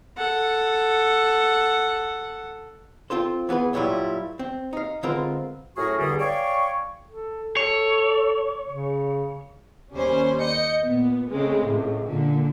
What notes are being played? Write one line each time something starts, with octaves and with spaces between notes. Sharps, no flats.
A4 F#5
C4 F4 A4 C5
E3 B3 G#4 B4
G2 A#2 F#3 G3 E4 F4
C4
D#4 F5
D3 G#3 C4 F4 A#4 B4
F#2 A2 F#4 G#4 A#4 C#6
E2 G2 D3 G3 G#4
C#5 D5 F5 G5 G#5 C#6
A4
A4 C#5
C#3
D#2 G3 C#4 C5
D#5 G6 C#7
A#2 B3
C#3 G#3 A3 C4
C#2 A2
A#2 D3